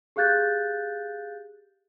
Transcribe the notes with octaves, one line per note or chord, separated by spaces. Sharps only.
G4 G#4 F5 F#6 G6 A6